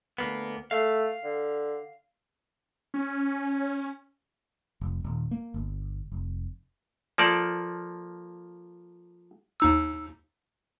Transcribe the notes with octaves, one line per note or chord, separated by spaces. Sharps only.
D2 A#3 B3
A3 F5
D3
C#4
F1
D#1
A#3
G1
F1
F3 A#3 A4 D5
D#2 D#4 E6